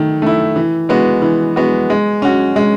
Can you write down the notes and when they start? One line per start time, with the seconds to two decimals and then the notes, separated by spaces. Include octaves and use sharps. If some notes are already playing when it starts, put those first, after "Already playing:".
Already playing: D#3 A3
0.22 A3 E4
0.56 E3
0.89 G#3 B3 F#4
1.22 E3
1.56 G#3 B3 F#4
1.90 G#3
2.22 C#4 F#4
2.56 G#3